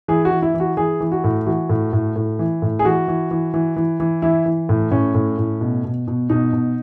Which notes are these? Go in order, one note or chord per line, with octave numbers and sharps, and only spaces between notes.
E3 G#4
F#4
E3
E4
E3
F#4
E3 G#4
E3
F#4
A2
E3 F#4
A2
A2
A2
E3
A2
G#4
E3 F#4
E3
E3
E3
E3
E3
E3 E4
E3
A2
A2 C#4
A2
A2
B2
B2
B2
B2 D#4
B2